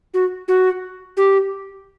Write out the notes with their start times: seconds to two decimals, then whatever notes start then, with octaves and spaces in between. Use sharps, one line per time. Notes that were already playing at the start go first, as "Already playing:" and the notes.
0.14 F#4
0.48 F#4
1.17 G4